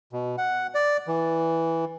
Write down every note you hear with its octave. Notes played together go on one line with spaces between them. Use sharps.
B2
F#5
D5
E3